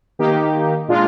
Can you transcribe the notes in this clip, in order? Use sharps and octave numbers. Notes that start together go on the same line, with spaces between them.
D#3 A#3 D#4 G4
A#2 G#3 D4 F4